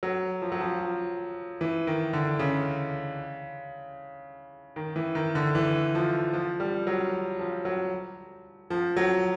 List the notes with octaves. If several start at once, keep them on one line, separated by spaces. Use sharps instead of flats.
F#3
F3
F#3
F3
F3
E3
D#3
D3
C#3
D#3
E3
D#3
D3
E3
F3
F3
G3
F#3
F3
F#3
F3
F#3